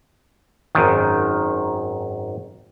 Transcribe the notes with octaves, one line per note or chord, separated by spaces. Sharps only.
G#1 F#2 D#3